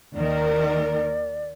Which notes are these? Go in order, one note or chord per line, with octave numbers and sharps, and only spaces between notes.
D#2 D#3 A#4 D5